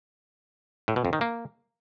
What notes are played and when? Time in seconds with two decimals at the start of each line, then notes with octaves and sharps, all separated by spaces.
0.88 A2
0.96 B2
1.05 F2
1.13 D#3
1.21 A#3